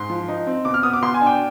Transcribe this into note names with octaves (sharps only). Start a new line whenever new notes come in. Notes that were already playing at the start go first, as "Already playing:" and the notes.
Already playing: G#2 C6
F3
D#4
C4
B2 D6
F6
B3 D#6
D6
B2 C6
G#5
D4
G5